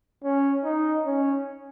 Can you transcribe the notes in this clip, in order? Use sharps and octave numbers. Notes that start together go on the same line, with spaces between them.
C#4
D#4
C#4